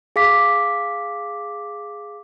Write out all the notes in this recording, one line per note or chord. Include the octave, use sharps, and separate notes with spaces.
G#4 F5 D6 B6